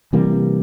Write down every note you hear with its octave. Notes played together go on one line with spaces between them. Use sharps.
C3 E3 G3 A#3